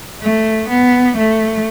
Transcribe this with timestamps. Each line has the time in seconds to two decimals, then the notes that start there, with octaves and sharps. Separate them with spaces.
0.22 A3
0.70 B3
1.17 A3